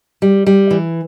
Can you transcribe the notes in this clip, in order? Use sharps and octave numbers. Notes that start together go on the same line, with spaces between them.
G3
G3
E3